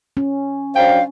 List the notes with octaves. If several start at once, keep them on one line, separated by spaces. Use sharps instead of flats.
C#4
F#3 D4 C5 F5 G5